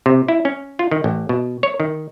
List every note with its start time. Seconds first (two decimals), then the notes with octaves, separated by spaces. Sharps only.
0.06 C3
0.28 E4
0.45 C#4
0.79 F4
0.91 D#3
1.04 A1
1.29 B2
1.63 C#5
1.80 D#3